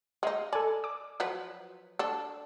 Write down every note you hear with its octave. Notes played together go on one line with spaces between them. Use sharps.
G#3 D#4 D#5 F5
A4 D5 G#5
D6
F3 F#3 B4
D4 A4